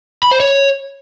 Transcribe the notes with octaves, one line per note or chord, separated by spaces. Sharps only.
B5
C5
C#5